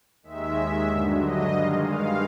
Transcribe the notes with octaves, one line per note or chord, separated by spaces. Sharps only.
D#2 D#3 G#3 E5
G2 D3 F#3
D#5
G2 D#3 G#3 F5
F5